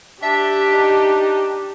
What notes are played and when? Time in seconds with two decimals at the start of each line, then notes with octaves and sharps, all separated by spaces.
0.23 D4 G4 E5
0.72 D#4